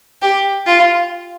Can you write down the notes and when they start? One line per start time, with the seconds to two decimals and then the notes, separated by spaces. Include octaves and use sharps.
0.22 G4
0.66 F4